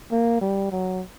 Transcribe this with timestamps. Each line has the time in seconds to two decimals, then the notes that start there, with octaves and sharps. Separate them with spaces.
0.11 A#3
0.41 G3
0.72 F#3